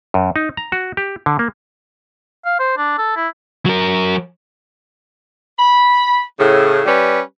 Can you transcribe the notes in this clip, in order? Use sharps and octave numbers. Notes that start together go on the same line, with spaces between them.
F#2
D#4
A#5
F#4
G4
D3
A#3
F5
C5
D4
A4
E4
F#3 A#4
B5
A2 C#3
G3 C#4 G4 B4